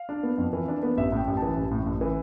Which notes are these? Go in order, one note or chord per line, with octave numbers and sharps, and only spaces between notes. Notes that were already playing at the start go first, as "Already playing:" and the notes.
Already playing: F5
D4
B3
F2
E3
D4
B3
A1 E5
A2 G5
A1
A5
E3
A1
A2
A1
E3